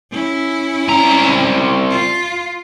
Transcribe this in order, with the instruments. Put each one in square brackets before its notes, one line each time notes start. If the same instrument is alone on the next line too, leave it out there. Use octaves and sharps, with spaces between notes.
[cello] C#4 E4
[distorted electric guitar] C2 A#5
[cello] F4